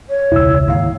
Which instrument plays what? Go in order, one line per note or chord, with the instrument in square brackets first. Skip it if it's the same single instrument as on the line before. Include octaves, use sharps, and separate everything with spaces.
[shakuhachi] C#5
[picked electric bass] E1 C#2 [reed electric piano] E4 E6
[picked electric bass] D#2 G#2 [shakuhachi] F5